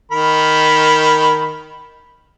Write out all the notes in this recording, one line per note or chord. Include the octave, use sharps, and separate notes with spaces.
D#3 A#4 B5